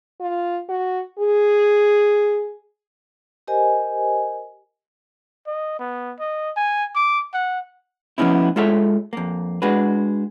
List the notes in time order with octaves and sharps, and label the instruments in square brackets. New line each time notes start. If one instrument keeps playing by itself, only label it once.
[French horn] F4
F#4
G#4
[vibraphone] G4 A#4 C5 D#5 G#5
[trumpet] D#5
B3
D#5
G#5
D6
F#5
[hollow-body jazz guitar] F3 A#3 B3 C#4 D#4 E4
G#3 F4 A4 C#5 E5
F2 A#3
G#3 D4 F#4 B4